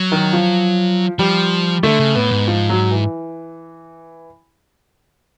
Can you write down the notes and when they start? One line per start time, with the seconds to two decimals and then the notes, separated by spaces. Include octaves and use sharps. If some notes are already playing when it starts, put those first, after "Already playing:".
Already playing: F#3
0.12 D#3
0.33 F3
1.19 F3 G3
1.83 D3 A3
1.99 C#3
2.15 A2 B3
2.31 G#2
2.48 F3
2.70 F#3
2.91 E3